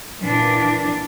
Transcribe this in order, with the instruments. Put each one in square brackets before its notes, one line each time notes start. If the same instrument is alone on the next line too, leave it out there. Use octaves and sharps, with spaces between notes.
[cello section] A#2 E3 D4